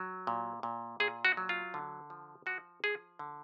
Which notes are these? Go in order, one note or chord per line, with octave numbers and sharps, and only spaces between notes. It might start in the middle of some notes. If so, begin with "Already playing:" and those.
Already playing: F#3
A#2
A#2
A#2 G#4
F#4
F#3
F4
D3
F3
F3 F#4
F3 G#4
D3